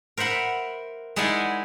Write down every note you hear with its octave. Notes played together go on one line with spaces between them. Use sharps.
A#4 C5 E5 F#5 B5
G#3 D#4 E4 D5 F#5 G#5